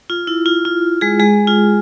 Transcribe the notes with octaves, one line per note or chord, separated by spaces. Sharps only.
F4
E4
F4
F4
G#3 G#4
G#3 G#4
F4